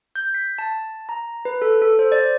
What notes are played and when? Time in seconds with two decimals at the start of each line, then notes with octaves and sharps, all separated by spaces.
0.16 G6
0.34 B6
0.58 A5
1.09 A#5
1.45 B4
1.62 A4
1.82 A4
1.99 C5
2.12 D5